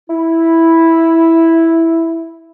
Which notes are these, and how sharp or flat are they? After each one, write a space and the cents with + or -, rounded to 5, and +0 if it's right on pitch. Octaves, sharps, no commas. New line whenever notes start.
E4 -5